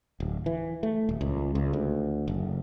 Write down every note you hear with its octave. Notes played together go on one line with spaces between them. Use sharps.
D1
E3
A3
D#1
C#2
C#2
D2
F#1